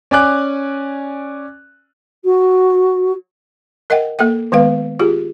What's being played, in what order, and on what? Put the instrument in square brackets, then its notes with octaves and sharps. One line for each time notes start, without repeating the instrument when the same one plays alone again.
[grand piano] C#4 D5 G#5 D6 F#6
[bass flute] F#4
[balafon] A#4 D#5 E5 F#5 G5
A#3 A4 E5 G5
D#3 G#3 B3 B4 F5
F4 G4 G#4